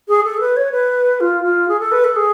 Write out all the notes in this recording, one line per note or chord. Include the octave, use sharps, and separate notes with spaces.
G#4
A4
B4
C#5
B4
F4
F4
G#4
A4
B4
A4
G#4